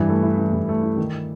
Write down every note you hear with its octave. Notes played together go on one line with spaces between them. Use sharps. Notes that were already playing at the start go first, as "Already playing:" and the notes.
Already playing: G2 E3
A3
E4
E3
G2
A3
E4
D#3